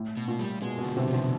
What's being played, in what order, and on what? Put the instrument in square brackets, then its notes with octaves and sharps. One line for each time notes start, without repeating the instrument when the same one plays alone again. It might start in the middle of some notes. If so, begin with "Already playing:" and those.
Already playing: [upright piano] A2
[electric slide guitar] B2
[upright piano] A#2
[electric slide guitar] G3
[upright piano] B2 [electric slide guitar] G#3
[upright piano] B2
[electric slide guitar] D3
[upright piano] C3
[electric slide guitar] F3
[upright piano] C3